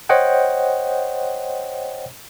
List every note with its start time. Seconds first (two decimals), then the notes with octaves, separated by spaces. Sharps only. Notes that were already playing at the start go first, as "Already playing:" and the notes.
0.09 C5 C#5 D#5 F#5 G5